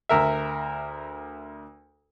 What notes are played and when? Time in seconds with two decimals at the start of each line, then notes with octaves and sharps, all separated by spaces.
0.09 D2 A#4 E5